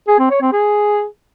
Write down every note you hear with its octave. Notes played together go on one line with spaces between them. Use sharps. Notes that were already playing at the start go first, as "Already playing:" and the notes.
G#4
C4
C#5
C4
G#4